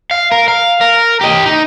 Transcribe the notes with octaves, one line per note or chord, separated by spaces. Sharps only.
F5
A#4
F5
A#4
G4 D#5
D#4